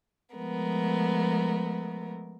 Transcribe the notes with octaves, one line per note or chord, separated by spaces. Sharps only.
F3 G#3 A3 B3 A#4